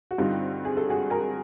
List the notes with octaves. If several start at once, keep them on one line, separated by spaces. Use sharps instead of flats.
F#4
G2 D3 G3 C4 D#4 F4
G#4
A4
F#4 G#4
G#4 A#4